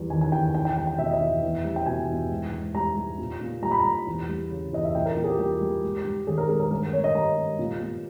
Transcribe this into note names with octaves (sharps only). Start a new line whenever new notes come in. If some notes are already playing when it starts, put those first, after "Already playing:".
Already playing: E2 G3
D#3 G#5
G#5
E2 G5
E2 G5
G5
G3 G5
G5
B2 E5
D#5
E5
E2
E2
G3
G5
B2 G#5
E2
G#2
G#2
G3 A#5
G3
A#2
A#2
G3 A#5
B5
A#5
G3
E2
G3
C#3
E2 D#5
E5
A#2 G5
A#4
A#2
G#4
G4
G3 G4
G3
G#2
G3
D#3 G#4
A#4
G#2 G#4
A#4
G2 A#4
G2 C#5
D#5
G3 A#5
G3
A#2
A#2